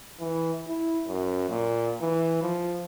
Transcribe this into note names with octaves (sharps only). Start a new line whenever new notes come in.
E3
E4
F#2
A#2
E3
F3